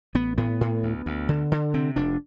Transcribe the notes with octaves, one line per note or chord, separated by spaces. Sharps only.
A1 B3
A2 B3
A2
D2
D2
D3
D3
C3 C4
F1 D4